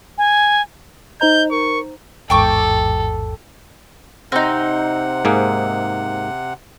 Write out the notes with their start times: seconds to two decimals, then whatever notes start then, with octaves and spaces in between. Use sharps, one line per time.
0.18 G#5
1.21 D#4 C5 D#5 A#5 G6
1.51 A#4 C#6
2.30 A1 E2 G#2 A4 G5 C#6 D6
4.32 C3 C4 D#4 F#5
5.25 G#2 A#3 G#4